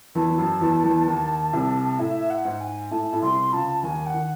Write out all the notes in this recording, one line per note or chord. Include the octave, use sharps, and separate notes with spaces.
E2 E3 A5
E3
F#2 F#3
E2 E3
E2 E3
D#2 D#3
C2 C3
A2 E5
F#5
G#2
G#5
A2 A5
A2
C2 C3 C6
C#2 C#3 A5
D#2 D#3 G#5
F#5
D#3